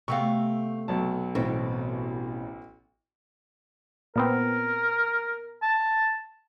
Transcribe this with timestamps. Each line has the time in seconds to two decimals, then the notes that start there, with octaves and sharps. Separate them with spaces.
0.08 C3 A3 B3 F5 G5 C#6
0.88 B1 F#3 A5
1.35 A1 B2 C4
4.16 A#2 B3 C4 A#4
5.63 A5